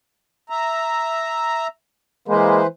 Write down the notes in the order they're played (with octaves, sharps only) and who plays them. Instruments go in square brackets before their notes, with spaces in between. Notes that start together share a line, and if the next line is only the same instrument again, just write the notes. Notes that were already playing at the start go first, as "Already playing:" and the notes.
[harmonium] E5 A#5
[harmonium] E3 B4 C5 [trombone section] G#3 A#3